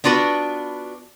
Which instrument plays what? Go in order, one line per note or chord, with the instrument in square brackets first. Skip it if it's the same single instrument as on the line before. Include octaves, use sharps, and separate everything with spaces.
[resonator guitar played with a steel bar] B3 D4 F4 F#4 B4